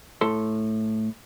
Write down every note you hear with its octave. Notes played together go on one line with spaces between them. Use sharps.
A2 A4 C6